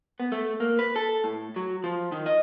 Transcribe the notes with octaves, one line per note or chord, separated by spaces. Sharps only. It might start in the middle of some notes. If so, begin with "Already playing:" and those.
B3
A3
A#3
B4
A4
A2
F#3
F3
D#3
D#5